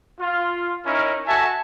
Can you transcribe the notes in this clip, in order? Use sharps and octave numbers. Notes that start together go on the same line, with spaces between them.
F4
C#4 D#4 E4 A#4
F#4 A4 E5 G#5 A5